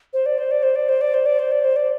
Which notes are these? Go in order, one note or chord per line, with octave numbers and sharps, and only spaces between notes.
C5
D5
C5
D5
C5
D5
C5
D5
C5
D5
C5
D5
C5
D5